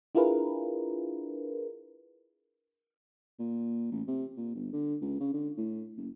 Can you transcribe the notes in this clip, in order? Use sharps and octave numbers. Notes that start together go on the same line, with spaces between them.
D4 E4 F4 G#4 A#4 B4
A#2
A1
C3
A#2
G1
D3
C#2
C#3
D3
A2
F#1